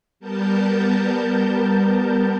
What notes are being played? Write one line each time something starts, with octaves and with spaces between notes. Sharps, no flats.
G3 B3 A#4 A5 G6